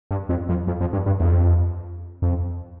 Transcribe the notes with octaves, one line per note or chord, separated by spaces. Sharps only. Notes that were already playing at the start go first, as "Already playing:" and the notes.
G2
F2
F2
F2
F2
G2
G2
E2
F2
F2